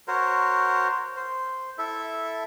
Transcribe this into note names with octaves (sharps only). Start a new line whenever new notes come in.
F#4 A#4 C5 C#5
C5
E4 A4 E5